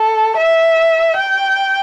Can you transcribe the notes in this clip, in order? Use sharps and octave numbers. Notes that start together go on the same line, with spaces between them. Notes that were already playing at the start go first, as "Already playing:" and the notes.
Already playing: A4
E5
G5